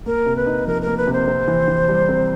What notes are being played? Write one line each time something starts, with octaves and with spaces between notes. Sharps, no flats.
A#3 A#4
C3
B4
D#4
F3 A#4
A#4
A#3
B4
C3
C5
C4
E3
E3
G3
C4